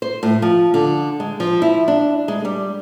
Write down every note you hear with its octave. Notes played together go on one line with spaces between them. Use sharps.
C5
A2
F3
D3
G#3
F3
E4
D4
G#3
G3